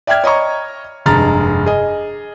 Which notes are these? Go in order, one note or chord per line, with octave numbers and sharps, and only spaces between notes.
D5 E5 G5 F6 G#6
C#5 D#5 A#5 C#6
F1 G2 G#3 A#5 F6 A6
G#4 D#5